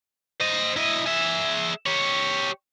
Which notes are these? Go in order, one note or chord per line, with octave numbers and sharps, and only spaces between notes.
C5 D#5
E4 D#5
G#4 E5
G4 C#5